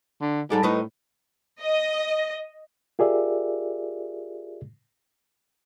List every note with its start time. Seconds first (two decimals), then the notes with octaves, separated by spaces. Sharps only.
0.21 D3
0.50 G#2 G3 A4 D5
0.63 A2 D#4 B4 D#5
1.60 D#5
2.99 F4 G4 G#4 A#4 D5 E5